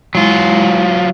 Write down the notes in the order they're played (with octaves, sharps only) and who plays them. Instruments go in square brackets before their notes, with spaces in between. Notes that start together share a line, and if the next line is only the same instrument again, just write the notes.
[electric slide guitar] F#3 F4 [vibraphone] G#3 E4